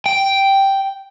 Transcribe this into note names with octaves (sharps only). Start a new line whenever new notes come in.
G5